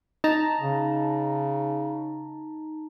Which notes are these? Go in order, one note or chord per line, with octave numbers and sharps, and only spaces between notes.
D#4 A5 A#5
C#3